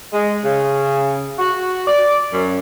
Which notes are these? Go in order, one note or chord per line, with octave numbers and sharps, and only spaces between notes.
G#3
C#3
F#4
D5
F#2